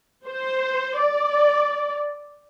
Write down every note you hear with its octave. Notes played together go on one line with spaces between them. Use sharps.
C5
D5